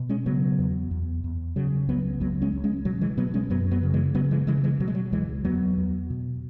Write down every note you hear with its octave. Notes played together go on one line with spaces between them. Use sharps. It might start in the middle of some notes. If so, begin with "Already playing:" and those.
Already playing: B2
G#3 C#4
C#3 F#3 B3
E2
E2
E2
C#3 F#3
C#2 F#3 B3
C#2 F#3 B3
G#3 C#4
C#2
G#3 C#4
B2 F#3
E3 G#3
B2 F#3 B3
G#3 C#4
F#2 F#3 B3
F#3 B3
C#3
E3 G#3
C#3 F#3 B3
E3 G#3
C#3 E3 G#3
E3 G#3
B2 F#3
G#3
F#3
C#2 E3 G#3
E2 F#3 B3
E2
B2